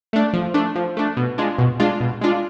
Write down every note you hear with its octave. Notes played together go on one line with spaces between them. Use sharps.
A3 D4
F3
A3 D4
F3
A3 D4
B2
G#3 D4 F4
B2
G#3 D4 F4
B2
G#3 D4 F4